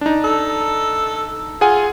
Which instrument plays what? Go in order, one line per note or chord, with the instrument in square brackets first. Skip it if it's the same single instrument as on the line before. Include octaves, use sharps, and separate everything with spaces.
[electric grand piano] D4 D#4
[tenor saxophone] A4
[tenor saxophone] F4 [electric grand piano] G#4 F#5 G#5